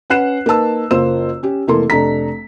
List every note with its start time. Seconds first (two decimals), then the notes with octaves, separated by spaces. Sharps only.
0.10 C#4 B4 F#5 F#6 C7 E7
0.46 A#3 D#4 B4 A5 E6
0.91 F#1 A#3 F4 C5 E6 E7
1.43 C#4 G4
1.67 F1 E3 A#3 A4 C6
1.90 F1 D4 A4 A#5 B6